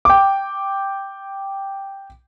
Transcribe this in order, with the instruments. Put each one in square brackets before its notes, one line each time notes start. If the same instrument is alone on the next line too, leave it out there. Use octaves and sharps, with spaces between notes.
[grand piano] G5 D6